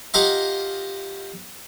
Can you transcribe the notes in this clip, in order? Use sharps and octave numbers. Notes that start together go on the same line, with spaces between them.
F4 G4 A#4 D#5 F5 F#5